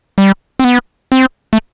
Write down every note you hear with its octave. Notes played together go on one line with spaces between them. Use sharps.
G3
C4
B3
C4
A3